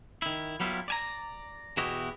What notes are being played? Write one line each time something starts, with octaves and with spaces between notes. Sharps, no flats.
D#3 E4
F#3 G3 B3 E4 F4
D5 G#5 A#5
E2 B2 E4 F#4 G4 D#5